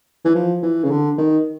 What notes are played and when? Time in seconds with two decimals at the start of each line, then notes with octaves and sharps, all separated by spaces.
0.25 E3
0.35 F3
0.63 E3
0.84 C#3
0.91 D3
1.18 D#3